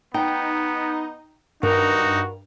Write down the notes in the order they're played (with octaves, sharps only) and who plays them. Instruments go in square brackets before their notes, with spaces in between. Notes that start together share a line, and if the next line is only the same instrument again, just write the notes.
[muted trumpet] B3 [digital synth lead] D#4 [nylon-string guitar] G5
[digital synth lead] G2 [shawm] D#4 [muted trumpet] F#4 [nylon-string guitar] A#4